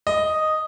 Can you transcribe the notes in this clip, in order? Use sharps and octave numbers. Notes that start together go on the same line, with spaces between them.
D#5